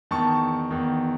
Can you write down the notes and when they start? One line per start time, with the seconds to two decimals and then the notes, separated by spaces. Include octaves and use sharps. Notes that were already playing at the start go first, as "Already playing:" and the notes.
0.11 E2 D#3 A5 C#6
0.71 E2 D#3